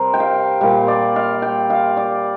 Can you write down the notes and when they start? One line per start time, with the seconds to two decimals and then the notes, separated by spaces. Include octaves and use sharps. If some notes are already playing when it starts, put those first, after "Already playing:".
Already playing: C3 G3 A#4 C5
0.14 G5
0.20 F5
0.61 A#2 G3 F5
0.88 D5
1.16 F5
1.42 G5
1.70 F5
1.97 D5